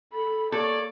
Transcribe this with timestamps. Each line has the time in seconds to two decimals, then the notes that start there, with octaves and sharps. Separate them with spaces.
0.13 A4 B5
0.52 A#3 A4 C#5 D5 C#6